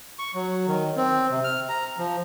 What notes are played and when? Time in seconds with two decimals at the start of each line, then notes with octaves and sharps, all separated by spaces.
0.19 C#6
0.34 F#3
0.68 D#3
0.96 C4
1.31 C3
1.44 F6
1.69 A#5
1.98 F3